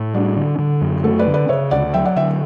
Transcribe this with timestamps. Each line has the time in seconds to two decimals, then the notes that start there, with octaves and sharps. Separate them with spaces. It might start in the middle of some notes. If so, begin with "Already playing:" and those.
Already playing: A2
0.14 G3 D4 F#4
0.36 D3
0.59 D3
0.82 F#2
1.04 A3 F#4 A4
1.19 B4 D5
1.27 D3
1.34 B4 D5
1.49 C#3 C#5 E5
1.71 D2 D5 F#5
1.94 F#3 E5 G5
2.05 D5 F#5
2.16 D3 E5 G5